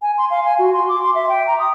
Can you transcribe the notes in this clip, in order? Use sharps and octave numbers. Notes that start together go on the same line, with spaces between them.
G#5
C6
F5
G#5
F#4
C6
D6
C6
E5
G5
A#5
D#6